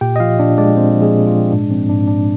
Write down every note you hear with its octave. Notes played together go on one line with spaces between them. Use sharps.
A#2 G4 G5
D#5
F3 F4 F5
A#2 D4 D5
G#3 D4 D5
A#2 C4 C5
F3
G#3 G#4
A#2
F3 F4
G#3
G#2 D4
F3 C4
G#2 D4
G#3 D4